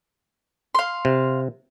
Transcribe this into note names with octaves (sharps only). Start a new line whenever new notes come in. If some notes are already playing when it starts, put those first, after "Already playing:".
F5 C6
C3